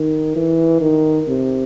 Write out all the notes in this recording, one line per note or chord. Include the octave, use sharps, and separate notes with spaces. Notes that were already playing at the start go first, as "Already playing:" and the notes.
Already playing: D#3
E3
D#3
C3